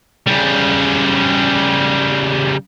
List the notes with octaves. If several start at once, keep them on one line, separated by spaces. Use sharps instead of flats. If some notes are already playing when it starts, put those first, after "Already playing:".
C#3 G3